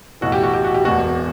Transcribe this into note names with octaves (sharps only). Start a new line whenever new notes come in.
B1 A2 E3 F#4
G4
F#4
G4
F#4
G4
E1 E2 B2 F#4